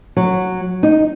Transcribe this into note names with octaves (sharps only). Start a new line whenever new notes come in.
F#3
D#4